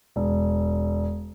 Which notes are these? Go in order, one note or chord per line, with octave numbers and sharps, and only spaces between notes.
E1